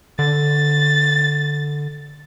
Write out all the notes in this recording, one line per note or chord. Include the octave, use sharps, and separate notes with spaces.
D3 A6